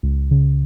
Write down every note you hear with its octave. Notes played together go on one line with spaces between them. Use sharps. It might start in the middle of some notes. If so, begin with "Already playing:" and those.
C#2
C#3